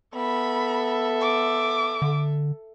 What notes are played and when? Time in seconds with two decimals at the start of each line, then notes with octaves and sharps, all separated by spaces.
0.15 B3 A4 E5 B5
1.22 D6
2.02 D3